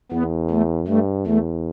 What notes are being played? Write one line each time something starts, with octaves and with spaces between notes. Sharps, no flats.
E2 B3
A3
G2 A3
E2 A3